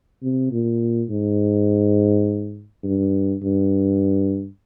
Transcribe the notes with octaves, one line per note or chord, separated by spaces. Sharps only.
C3
A#2
G#2
G2
G2